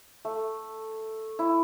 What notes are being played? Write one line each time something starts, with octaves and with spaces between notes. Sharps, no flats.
A3
E4